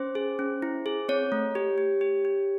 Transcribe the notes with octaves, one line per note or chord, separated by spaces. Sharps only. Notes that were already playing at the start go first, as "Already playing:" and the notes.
Already playing: C#4 C5
G#4
C#4
E4
G#4
C4 C#5
A3
G4
G4
G4
G4